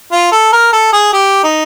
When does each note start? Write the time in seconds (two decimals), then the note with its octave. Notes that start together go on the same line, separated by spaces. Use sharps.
0.12 F4
0.32 A4
0.53 A#4
0.73 A4
0.93 G#4
1.13 G4
1.44 D#4